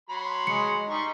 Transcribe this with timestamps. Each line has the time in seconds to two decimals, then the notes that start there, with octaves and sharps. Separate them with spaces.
0.09 F#3 B5 C6
0.47 G#3 C#7
0.90 G3 D#4 C6 C#6